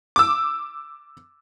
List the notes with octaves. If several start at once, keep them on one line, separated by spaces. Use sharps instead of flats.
D6 E6